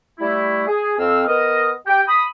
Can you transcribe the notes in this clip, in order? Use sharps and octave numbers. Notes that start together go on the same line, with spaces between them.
G3 A3 E4
G#4
F2 C4 F5 E6
B3 A#4 D#5
G4 G5
B5 D#6